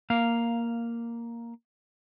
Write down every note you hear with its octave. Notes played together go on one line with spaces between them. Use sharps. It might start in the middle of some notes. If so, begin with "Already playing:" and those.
A#3 F5